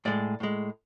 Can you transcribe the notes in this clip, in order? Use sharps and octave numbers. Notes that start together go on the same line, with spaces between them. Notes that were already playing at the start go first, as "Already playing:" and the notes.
A2 G#3 D5
A2 G#3